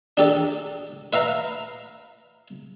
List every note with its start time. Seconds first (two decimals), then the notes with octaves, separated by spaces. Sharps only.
0.17 D4 G4 A4
1.13 B4 E5 F5 A#5